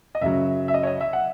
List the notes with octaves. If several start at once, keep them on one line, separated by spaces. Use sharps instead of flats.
D#5
F#2 C#3 F#3 E5
E5
D#5
C#5
D#5
E5
F#5